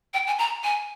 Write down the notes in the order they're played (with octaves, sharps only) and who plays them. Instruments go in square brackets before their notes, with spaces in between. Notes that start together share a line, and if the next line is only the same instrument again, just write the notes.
[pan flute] G5
G#5
A#5
G#5